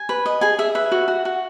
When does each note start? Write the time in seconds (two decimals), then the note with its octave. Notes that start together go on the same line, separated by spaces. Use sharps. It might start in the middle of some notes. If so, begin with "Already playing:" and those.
Already playing: G#5
0.09 B4
0.26 D#5
0.41 G#4 G#5
0.59 G#4 E5
0.75 B4 E5
0.92 F#4
1.08 F#4
1.25 F#4